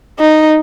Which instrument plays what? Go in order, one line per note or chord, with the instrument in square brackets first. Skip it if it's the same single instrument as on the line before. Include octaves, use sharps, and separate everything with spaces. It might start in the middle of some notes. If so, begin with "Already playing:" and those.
[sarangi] D#4